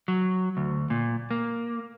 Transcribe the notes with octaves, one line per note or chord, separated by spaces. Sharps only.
F#3
D2
A#2
A#3